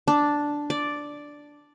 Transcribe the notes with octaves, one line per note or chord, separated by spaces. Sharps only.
D4
D5